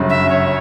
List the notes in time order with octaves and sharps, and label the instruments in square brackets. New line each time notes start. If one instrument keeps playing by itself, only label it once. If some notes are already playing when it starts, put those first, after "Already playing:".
Already playing: [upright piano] G1 F#2 C#3
[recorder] E5
C#5